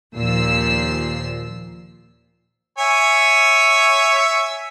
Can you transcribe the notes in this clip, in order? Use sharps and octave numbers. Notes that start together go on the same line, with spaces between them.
D#2 A#2 F3 E6 C7
C#5 E5 G#5